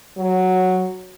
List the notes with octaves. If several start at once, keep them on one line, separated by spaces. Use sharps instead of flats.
F#3